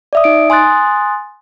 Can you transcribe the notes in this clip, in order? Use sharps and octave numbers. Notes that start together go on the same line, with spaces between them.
D5 E5 D#6
D#4 D7
G#5 C6 D#6 F#6 A6